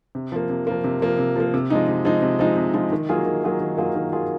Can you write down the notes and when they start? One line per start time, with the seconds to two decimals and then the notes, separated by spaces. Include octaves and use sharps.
0.15 C3
0.32 F3 A#3
0.50 C3
0.67 F3 A#3
0.84 C3
1.02 F3 A#3
1.19 C3
1.36 F3 A#3
1.54 C3
1.70 F3 G#3 D#4
1.88 C3
2.05 F3 G#3 D#4
2.22 C3
2.39 F3 G#3 D#4
2.57 C3
2.74 F3 G#3 D#4
2.92 D#3
3.09 F#3 A#3 F4 G#4
3.26 D#3
3.44 F#3 A#3 F4 G#4
3.60 D#3
3.78 F#3 A#3 F4 G#4
3.95 D#3
4.12 F#3 A#3 F4 G#4